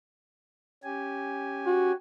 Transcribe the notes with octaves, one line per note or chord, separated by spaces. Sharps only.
C#4 G4 G#5
F#4